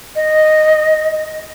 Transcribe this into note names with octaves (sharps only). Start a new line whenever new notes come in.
D#5